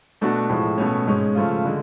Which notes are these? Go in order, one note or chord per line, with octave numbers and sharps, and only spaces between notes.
B2 A3 D4 F#4
A2 F3 G#3
B2 A3 C#4
G#2 G#3 C#4
C#3 F3 A3 F4
D3 G#3